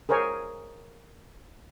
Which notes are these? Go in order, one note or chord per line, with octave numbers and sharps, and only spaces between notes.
G#4 A#4 C5 C#5 G#5